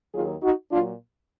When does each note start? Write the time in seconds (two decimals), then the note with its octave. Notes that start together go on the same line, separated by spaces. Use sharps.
0.13 D#2 D#3 F#3 F4 G#4
0.42 D#4 F#4
0.71 A#2 F#3 D4 F4